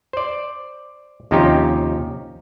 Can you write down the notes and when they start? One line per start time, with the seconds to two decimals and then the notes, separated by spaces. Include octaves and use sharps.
0.13 C5 D5
1.31 D#2 C3 F3 C#4 D#4 G4